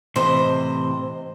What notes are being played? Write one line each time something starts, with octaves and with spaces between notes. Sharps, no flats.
A2 C3 E3 C5 D#5